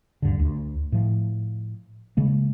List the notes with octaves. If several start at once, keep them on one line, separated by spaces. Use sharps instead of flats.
D2 G2 D3
D2
A2 F3
C#3 G#3 A#3